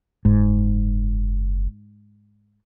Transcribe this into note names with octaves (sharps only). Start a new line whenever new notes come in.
F#1 G#2